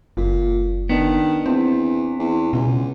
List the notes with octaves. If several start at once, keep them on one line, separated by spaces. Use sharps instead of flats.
F#1 A#2
D#3 B3 D4
E2 C4
E2
C#2 B2